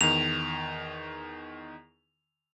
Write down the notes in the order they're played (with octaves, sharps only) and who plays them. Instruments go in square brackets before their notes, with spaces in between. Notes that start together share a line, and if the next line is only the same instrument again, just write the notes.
[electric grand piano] E2 D#3 [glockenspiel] F7